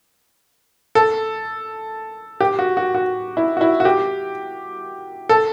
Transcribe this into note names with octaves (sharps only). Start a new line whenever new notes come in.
A4
G4
F#4
F#4
F#4
E4
F#4
E4
F#4
G4
A4